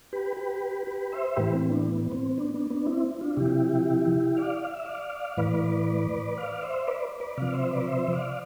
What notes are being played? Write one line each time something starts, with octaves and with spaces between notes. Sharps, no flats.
G4 B4
G4 B4
G4 B4
C5 E5
A2 E3 G4 B4
C4
B3 D4
B3
C4
B3 D4
B3 D4
B3 D4
C4 E4
D4 F4
C3 F3 E4 G4
D5 F5
F5
E5
D5 F5
A2 E3 B4 D5
D5 F5
C5 E5
B4 D5
B4 D5
C3 F3 D5 F5
C5 E5
B4 D5
C5 E5
D5 F5